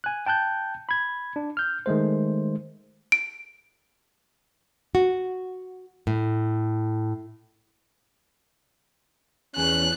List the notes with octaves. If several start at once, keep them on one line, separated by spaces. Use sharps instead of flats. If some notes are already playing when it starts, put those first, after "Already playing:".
G#5 F#6
G5 A5 F#6 G6
B5 G#6
D4
F6 G6
D#3 G#3 A3 C5
D7
F#4
A2
E2 C#4 F#6